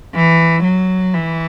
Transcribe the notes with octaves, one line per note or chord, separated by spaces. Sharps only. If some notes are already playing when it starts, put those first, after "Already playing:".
E3
F#3
E3